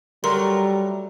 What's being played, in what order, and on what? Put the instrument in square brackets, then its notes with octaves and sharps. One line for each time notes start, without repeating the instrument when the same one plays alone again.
[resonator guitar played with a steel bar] F#3 A3 A#4 [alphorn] G3 [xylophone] C6